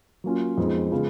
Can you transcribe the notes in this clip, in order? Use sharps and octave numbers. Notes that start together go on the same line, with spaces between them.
F#3 A#3 C#4 F4
F2 F3 G#3 B3 D#4
C#3 F3 G#3 B3 F4